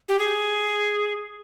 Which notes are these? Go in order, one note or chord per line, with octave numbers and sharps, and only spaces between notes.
G4
G#4